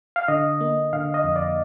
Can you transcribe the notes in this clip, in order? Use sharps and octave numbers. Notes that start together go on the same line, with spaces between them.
F5
D3 D#5
A#3
D3 F5
D#5
F2
D5